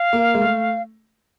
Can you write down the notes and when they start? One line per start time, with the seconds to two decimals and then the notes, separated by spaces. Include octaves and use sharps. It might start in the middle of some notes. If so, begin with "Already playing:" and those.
Already playing: F5
0.13 A#3
0.34 G#3
0.41 A3